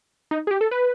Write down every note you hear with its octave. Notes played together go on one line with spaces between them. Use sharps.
D#4
G#4
G4
A4
B4